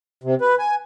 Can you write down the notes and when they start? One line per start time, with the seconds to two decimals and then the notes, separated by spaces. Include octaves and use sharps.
0.24 C3
0.41 B4
0.59 G#5